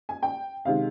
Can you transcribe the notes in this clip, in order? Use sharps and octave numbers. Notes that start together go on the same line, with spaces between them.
G#5
G5
C3 D#3 G#3 F5